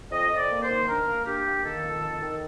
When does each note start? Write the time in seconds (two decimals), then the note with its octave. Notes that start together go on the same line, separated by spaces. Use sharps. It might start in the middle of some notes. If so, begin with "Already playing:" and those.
0.11 F2 D#5
0.30 F2
0.37 D5
0.50 A#3
0.62 C5
0.68 D#3
0.87 D4 A#4
1.07 A#3
1.26 D4 G4
1.44 A#3
1.64 D#3 A4
1.84 F2
2.02 D#3
2.21 D#3